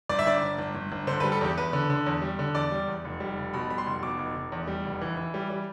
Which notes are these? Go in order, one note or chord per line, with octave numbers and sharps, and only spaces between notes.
G1 D5
E5
G1 D5
G1
G1
G1
G1
D3 C5
B4
G3
A4
E2 G4
E2 B4
D3
D3
E2
G3
D3
E2 D5
G3
E2
F1
G3
F1
B2 B5
G3 B5
C6
F1
B2 D6
F1
F1
E2
G3
F1
E3
E3
G3
G3